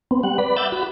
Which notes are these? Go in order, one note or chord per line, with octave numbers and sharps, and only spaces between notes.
B3 C4
G3 F#5
B4 D5 B5
E5 F#5 D6 E6 G6 A6
F#4 B5